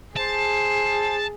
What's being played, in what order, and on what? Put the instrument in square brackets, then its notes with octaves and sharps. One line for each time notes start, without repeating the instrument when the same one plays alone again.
[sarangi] G#4 [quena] C5 [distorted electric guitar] A5